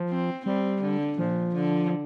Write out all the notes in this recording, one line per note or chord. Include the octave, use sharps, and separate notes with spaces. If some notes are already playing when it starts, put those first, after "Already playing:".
Already playing: F3
C4
G3 C4
D3
A#2 F3
D3